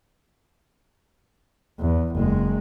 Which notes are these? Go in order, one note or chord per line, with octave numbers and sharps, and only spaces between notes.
E2
F#1 G#3